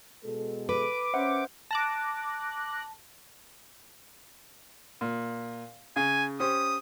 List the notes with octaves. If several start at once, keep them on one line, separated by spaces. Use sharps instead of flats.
B2 G#3 A4
B4 D6
C#4 C5 E5 F#5
A5 D6 F#6 A#6
A#2
C#3 G#5
C#4 G4 C5 D#6